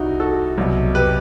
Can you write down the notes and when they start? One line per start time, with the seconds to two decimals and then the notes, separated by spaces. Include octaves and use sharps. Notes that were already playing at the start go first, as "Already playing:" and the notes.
Already playing: C2 C3 D#4 E4 F#4
0.20 F#4 A4
0.57 C2 B2 F#3
0.95 G4 B4